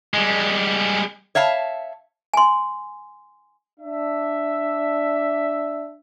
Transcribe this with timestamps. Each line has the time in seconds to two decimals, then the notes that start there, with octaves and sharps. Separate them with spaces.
0.14 G3 G#3
1.35 C#5 E5 F5 A5
2.34 G#5 C6
3.80 D4 E5